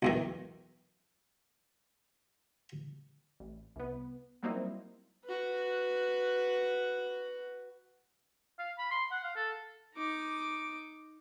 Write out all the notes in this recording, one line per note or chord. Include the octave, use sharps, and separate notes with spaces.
B1 E2 D#3
A1
C2 B3
F#3 G3 A#3 C4 D#4 E4
F#4 B4
F5
B5
C6
F#5
F5
A4
D#4 D6